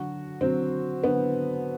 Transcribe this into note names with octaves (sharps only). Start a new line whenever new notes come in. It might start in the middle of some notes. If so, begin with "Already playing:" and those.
Already playing: D3 F#3 F#4
D3 F#3 C4
D3 F#3 B3